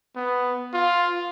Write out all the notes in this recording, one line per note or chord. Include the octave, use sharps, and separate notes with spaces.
B3
F4